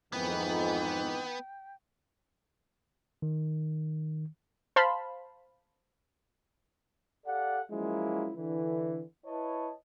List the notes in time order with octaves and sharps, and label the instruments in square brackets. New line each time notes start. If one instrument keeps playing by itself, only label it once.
[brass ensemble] F2 G#2 [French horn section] D#3 E3 D#4 [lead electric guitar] B3 [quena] G5
[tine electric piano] D#3
[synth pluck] C5 F5 A5 B5 C6
[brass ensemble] G4 A4 D5 F5 F#5
F3 F#3 G#3 A#3 C#4 E4
D3 E3
E4 B4 C#5 D#5 A5